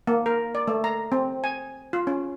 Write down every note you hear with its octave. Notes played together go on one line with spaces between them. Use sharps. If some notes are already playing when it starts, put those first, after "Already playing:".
A#3
A#4
D5
A3
A#5
C4
G#5
F4
C#4